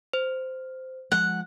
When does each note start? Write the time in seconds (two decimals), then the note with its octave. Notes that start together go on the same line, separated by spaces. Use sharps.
0.13 C5
1.12 F3 G#3 F#5